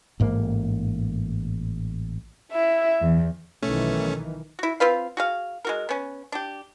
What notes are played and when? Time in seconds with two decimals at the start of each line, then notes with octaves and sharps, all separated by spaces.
0.20 A1 G#2 A#3
2.52 E4 E5
3.01 E2
3.63 B1 D#3 E3 A3 C#4
4.59 E4 F#4
4.80 C4 F4 B4 F5
5.17 F#4 G#4 F5
5.65 G#3 F#4 A#4
5.89 B3 C#4
6.32 D4 G4